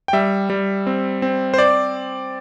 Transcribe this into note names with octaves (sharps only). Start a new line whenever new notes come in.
G5
G3 E5
G3
C4
C4
C5
D5